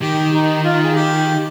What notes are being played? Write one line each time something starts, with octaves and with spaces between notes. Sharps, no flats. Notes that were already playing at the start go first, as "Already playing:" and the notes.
D#3 G4
D#4
F4
G#4
G4